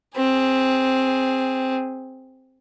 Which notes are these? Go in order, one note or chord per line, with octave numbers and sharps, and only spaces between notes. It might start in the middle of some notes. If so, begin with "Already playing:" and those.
C4 G#4